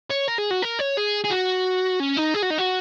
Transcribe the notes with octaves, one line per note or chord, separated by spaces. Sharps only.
C#5
A#4
G#4
F#4
A#4
C#5
G#4
G#4
F#4
C#4
D#4
G#4
F#4
D#4
F#4